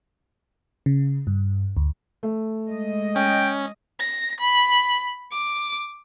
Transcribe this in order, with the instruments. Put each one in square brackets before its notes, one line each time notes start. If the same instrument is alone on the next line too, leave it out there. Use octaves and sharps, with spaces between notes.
[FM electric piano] C#3
G2
D2
[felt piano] A3
[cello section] G#3 D#5
[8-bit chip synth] C#4 [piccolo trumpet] G5
[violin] A#6
B5
D6